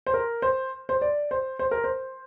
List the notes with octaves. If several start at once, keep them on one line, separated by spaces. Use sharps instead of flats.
C5
A#4
C5
C5
D5
C5
C5
A#4
C5